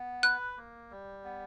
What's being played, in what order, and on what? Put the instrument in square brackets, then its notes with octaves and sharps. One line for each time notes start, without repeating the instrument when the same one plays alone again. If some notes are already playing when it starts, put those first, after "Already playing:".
Already playing: [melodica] B3
[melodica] B4 [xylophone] F#6
[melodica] A#3
G3
B3